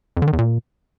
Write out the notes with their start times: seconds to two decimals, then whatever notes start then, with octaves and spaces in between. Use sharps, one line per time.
0.17 F2
0.22 D3
0.28 D#3
0.33 E2
0.38 A#2